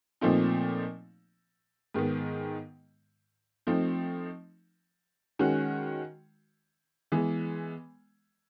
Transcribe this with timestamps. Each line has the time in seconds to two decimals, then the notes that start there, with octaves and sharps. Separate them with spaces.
0.21 A#2 F3 A3 C4 D#4
1.94 G#2 D#3 G#3 B3
3.67 F3 A3 C4 D#4
5.39 D#3 G#3 C#4 F#4
7.12 E3 G#3 B3